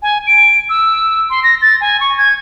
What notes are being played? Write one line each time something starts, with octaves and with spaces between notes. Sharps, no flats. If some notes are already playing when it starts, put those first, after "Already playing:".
G#5
D7
E6
C6
A#6
A6
G#5
C#6
G#6